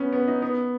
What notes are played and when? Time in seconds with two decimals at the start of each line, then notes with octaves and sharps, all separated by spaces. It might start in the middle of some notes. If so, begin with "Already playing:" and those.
Already playing: B3 C#4
0.13 B3
0.28 D#4
0.42 B3